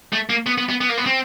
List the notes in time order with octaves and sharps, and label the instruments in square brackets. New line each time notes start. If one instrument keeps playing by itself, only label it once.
[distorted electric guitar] A3
A#3
B3
B3
B3
B3
A#3
B3
C4